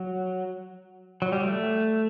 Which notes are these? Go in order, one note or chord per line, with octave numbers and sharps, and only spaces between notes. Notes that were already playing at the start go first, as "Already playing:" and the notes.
Already playing: F#3
F#3
G3
A3